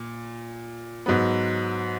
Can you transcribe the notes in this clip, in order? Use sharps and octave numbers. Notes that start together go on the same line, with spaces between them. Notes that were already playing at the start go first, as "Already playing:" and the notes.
Already playing: A#2
G#2 F#3 B3